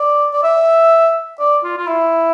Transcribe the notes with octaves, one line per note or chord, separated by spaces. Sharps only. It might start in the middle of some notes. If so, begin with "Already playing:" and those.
Already playing: D5
D5
E5
D5
F4
F4
E4